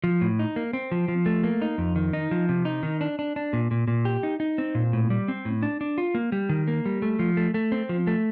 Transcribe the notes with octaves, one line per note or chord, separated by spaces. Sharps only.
F3
A2
D#4
A#3
C4
F3
F3
A3
A#3
D#4
F2
D#3
D#4
F3
C3
D#4
D#3
D4
D4
D4
A#2
A#2
A#2
G4
D#4
D#4
C4
A#2
A2
G3
C4
A2
D4
D4
F4
A#3
G3
D#3
A#3
G3
A3
F3
A3
A3
C4
F3
A3